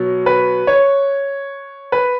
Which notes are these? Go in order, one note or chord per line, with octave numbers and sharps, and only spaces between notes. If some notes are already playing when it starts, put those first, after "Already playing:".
Already playing: B2 F#3
B4
C#5
B4